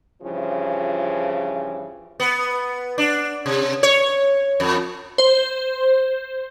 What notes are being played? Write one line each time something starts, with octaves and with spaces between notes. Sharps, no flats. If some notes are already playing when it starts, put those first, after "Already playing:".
G2 C#3 E3 F3
B3
D4
C3
C#5
F2
C5